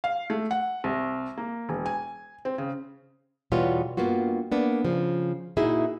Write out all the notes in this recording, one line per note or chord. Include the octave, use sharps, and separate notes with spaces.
F5
A3
F#5
C2
A#3
E1
G#5
C4
C#3
E2 B2 G3 B3 F4 C#5
G2 A#3 B3 F4 F#4
A#3 B3 D4
C#3 F3
A#2 D#4 E4 F#4 G#4 E5